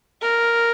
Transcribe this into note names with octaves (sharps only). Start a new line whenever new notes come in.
A#4